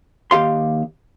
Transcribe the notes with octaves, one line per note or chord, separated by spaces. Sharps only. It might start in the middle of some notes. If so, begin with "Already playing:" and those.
D#2 G4 F5 C6